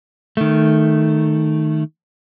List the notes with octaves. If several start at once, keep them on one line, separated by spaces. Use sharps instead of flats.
D#3 A3